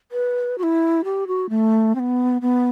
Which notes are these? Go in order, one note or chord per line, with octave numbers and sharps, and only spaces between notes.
B4
F#4
E4
G4
F#4
A3
C4
B3
B3